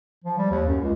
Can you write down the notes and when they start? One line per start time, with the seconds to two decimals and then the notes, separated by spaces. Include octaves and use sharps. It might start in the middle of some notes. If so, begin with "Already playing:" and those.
0.24 F3
0.38 G3
0.51 D#2
0.67 F#2
0.82 C#2